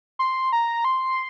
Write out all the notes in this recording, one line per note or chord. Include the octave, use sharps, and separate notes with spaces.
C6
A#5
C6